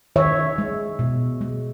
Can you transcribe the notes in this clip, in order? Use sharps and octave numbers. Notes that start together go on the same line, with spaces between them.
D#3 C#5 E5
G#3
B2
G#3